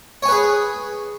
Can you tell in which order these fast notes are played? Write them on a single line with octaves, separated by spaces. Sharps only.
C#5 G#5 B4 G#4